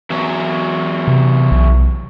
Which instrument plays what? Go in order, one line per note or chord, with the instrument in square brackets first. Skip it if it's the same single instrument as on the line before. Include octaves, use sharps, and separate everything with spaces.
[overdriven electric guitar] E2 F#3
[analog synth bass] C3
B1